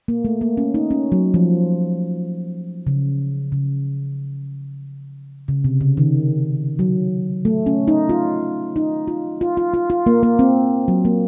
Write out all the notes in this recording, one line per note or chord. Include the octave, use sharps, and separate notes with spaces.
A#3
A3
A#3
C#4
D#4
C#4
F#3
F3
C#3
C#3
C#3
C3
C#3
D#3
F#3
A3
C#4
D#4
F4
D#4
F4
F4
F4
F4
F4
A#3
A#3
C4
F#3
A#3